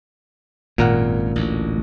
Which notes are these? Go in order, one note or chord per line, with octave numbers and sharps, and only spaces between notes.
G#1 F#2 A#2 A#4 F#5
A1 D2